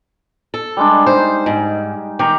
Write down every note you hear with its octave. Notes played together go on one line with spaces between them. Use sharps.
A4
G3 G#3 D4
D#4 C5
G#2
D#3 G4 A#5